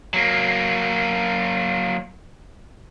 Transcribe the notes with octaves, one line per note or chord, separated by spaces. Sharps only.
F#3 A#3